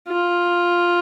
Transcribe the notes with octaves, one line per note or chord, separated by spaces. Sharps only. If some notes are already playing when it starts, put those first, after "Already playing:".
F4